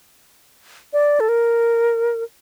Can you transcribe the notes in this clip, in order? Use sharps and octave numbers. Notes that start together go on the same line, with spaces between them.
D5
A4
A#4